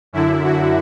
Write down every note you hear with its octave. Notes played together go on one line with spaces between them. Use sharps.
F#2 D3 E4
F#4